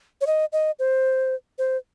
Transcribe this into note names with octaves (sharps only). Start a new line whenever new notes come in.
C#5
D#5
D#5
C5
C5